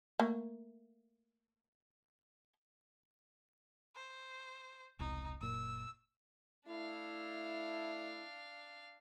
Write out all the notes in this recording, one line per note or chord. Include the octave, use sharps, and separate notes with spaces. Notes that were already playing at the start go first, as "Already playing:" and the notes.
A3 A#3
C5
E1 C2 D#4
F#1 A#2 E6
A3 D4 E4 F5